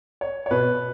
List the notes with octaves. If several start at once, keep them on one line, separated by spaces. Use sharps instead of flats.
C#5
C#5
B2 B4